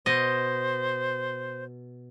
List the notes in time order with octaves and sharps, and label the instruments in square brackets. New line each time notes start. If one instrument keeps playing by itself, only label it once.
[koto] B2 D#5 [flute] C5